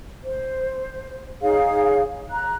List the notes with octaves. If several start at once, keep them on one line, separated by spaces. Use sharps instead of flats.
C5
D#4 G#4 C#5 F5
A#5 F#6